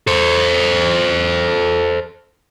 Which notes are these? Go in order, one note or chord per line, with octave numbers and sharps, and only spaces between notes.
A4 C5